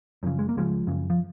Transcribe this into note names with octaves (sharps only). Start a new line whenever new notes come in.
F#2 C#3 F3
G#3
A#3
C#2 C#3 F3 G#3
F#2 C#3
F3